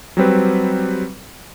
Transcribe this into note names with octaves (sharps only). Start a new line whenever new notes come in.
F#3 G3 C4 B4